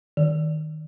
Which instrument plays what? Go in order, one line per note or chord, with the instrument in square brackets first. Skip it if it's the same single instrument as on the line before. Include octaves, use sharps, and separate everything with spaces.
[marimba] D#3